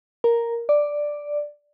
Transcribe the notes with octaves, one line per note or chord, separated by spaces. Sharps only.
A#4
D5